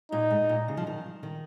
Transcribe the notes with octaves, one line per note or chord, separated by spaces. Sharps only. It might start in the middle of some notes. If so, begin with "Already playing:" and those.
A#2 D#4
G#2
A#2
C#3
F3
D#3
D#3